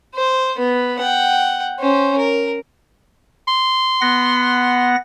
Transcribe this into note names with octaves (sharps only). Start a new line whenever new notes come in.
C5
B3 B4
F#5 G5
C#4 C5
A#4
C6
B3 F#5 A#6